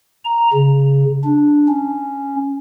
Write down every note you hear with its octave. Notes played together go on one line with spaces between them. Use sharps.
A#5
C#3
D4
C#4